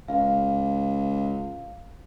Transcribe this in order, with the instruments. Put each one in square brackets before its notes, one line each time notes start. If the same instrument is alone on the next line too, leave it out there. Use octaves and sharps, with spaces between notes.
[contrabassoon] C#2 [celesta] F5